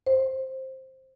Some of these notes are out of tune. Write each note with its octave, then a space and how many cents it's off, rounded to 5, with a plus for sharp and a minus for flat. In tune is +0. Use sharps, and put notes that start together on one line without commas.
C5 +10